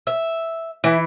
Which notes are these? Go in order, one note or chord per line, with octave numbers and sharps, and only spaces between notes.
E5
E3 E4